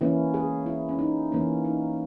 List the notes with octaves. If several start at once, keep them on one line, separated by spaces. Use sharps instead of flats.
E3 A#3 C#4 E4
G#4
E4
C#4
D#4
E3 A#3 C#4
D#4